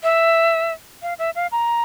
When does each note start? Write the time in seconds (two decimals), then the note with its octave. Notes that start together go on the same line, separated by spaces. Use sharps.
0.03 E5
1.02 F5
1.19 E5
1.35 F5
1.52 A#5